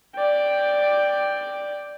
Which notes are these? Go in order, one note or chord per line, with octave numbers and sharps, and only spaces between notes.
D5 G5